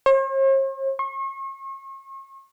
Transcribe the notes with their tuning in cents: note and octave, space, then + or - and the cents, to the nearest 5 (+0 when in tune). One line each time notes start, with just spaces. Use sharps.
C5 +45
C#6 -45